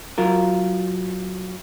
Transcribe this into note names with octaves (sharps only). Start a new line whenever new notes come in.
F#3 F4 A#4